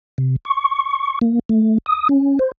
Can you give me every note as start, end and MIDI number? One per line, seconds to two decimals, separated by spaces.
0.18 0.36 48
0.45 1.19 85
1.21 1.39 58
1.49 1.78 57
1.86 2.08 87
2.09 2.39 61
2.39 2.52 72